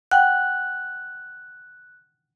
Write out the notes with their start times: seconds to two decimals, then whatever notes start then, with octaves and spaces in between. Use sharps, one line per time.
0.11 F#5 G5 F#6